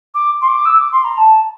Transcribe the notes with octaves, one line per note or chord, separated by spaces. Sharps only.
D6
C6
D6
E6
D6
C6
A#5
A5